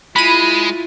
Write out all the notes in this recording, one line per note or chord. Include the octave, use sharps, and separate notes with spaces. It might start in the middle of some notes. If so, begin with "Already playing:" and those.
G#3 E4 F4 B5 D#7